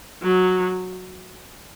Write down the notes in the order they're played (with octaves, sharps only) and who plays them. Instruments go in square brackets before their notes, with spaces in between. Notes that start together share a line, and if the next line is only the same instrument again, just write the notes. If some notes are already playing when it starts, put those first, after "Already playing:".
[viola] F#3